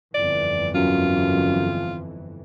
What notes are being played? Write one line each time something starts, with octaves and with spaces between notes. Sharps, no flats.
G1 F2 E3 D5
F#2 F4